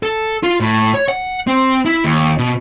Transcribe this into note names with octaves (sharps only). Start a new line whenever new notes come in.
A4
F4
A2
C#5
F#5
C4
E4
D#2
B2